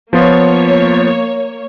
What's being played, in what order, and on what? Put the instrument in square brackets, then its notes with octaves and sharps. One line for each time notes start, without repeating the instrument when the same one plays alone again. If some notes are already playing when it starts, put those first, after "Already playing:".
[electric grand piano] F3 B3 F4 [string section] A#3 C#5